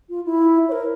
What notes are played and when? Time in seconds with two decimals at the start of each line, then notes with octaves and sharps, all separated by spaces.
0.10 F4
0.25 E4
0.68 C#5
0.72 A#4